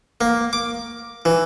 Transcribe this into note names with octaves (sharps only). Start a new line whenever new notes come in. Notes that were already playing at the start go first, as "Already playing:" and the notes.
A#3
D6
E3